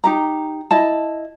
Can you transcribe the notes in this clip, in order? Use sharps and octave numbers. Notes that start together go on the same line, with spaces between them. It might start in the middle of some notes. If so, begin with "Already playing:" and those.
D#4 G4 A#5
E4 D#5 A5